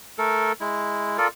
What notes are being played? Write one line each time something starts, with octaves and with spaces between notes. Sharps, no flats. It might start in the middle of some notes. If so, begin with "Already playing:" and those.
A3 A4 A#4
G#3 E4
F4 A4 A#4 D5